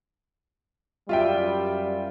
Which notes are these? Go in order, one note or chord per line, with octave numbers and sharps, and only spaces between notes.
F#2 G3 F4 E5 G5